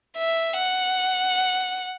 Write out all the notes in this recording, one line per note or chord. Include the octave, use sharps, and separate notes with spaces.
E5
F#5